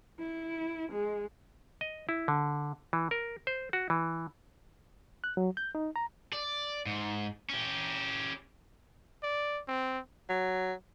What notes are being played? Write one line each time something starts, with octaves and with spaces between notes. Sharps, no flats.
E4
G#3
D#5
E4
D3
E3
A#4
C5
F#4
E3
F#6
F#3
G6
D#4
A#5
D5
G#2
C#4 G4
D5
C4
F#3